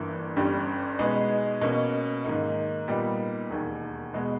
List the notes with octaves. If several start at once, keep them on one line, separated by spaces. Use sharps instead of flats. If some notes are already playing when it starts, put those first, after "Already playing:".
Already playing: G1 G2 E3 A#3
G1 G2 G3 C#4 G4
B2 G#3 B3 D#4 G#4
B2 A#3 C#4
G#2 D#3 A#3 D#4
A#2 G3 B3 D#4
E1 D#2 D#3
B2 G#3 B3